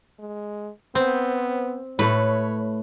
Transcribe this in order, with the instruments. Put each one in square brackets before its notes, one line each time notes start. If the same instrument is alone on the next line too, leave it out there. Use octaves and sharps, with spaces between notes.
[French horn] G#3
[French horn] B3 [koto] C4
[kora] A2 A3 [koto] B4 [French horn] C#5